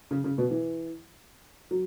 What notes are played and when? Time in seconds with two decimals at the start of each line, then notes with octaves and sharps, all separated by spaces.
0.11 C#3
0.24 C#3
0.38 B2
0.51 E3
1.71 F#3